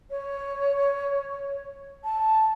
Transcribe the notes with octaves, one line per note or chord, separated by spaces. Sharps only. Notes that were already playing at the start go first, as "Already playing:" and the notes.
C#5
A5